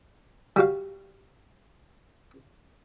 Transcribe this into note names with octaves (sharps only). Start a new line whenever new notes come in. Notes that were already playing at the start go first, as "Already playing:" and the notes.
G3 F#4 F5